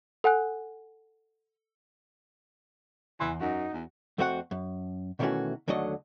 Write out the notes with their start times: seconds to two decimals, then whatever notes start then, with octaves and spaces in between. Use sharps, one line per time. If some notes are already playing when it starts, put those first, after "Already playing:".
0.24 A4 F#5 G#5 F#6
3.20 E2 E3 G#5 C6
3.40 F#2 D#4 F#4
3.73 E2
4.18 F2 A3 C4 F#4 A#4 F#5
4.51 F#2
5.19 B2 D#3 E3 A3 C#4 F#4
5.68 D#2 D3 F#3 A3 D#5